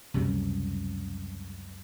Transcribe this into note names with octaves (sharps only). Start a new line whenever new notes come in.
C#2 F#2 C3 G3